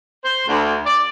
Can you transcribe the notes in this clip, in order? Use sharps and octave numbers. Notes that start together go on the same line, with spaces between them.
C5
D2
D5